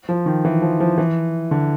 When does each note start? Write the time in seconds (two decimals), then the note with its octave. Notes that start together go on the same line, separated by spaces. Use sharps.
0.09 F3
0.26 D#3
0.45 E3
0.62 F3
0.80 F3
0.98 E3
1.51 D3